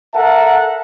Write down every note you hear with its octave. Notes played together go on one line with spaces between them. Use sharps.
A4 A#4 E5 F#5 A5